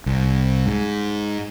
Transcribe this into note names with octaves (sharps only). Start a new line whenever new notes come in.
C2
G#2